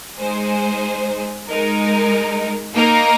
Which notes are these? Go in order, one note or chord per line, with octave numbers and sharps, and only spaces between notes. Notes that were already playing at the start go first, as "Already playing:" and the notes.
G#3 D#4 G#4 C5
G#3 D#4 A#4
A#3 D#4 A#4